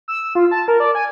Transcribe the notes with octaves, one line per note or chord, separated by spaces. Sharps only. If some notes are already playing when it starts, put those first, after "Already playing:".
E6
F4
A5
A#4
D5
G#5